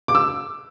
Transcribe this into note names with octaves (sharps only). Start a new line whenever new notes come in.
D6
E6